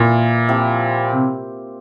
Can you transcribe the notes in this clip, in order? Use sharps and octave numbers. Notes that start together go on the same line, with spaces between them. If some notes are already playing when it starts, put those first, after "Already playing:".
Already playing: A#2 E3 A#3 E4
F3 C4 E4 G4
C3